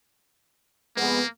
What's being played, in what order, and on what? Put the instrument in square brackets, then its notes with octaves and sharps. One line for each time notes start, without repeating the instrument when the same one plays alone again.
[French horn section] F2 G#3 B3 [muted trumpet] A#3